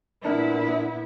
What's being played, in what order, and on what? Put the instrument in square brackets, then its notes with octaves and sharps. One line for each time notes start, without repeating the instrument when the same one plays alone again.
[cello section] A#2 B3 E4 [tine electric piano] D4 A#4